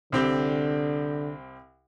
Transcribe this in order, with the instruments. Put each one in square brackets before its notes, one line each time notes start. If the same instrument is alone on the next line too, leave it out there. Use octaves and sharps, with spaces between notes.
[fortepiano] C2 C4 G4 [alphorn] D3